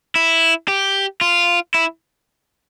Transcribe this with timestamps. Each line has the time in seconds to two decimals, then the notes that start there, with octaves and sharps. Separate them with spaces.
0.16 E4
0.68 G4
1.21 F4
1.74 E4